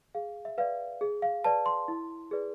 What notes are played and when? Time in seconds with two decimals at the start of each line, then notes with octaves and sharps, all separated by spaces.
0.15 G#4 F5
0.45 E5
0.58 B4 D5 F5
1.01 G#4
1.22 F5
1.44 B4 D5 A5
1.66 C6
1.88 E4
2.31 G#4 B4 D5